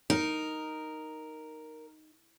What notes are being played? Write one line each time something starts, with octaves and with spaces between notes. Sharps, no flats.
D#4 A#4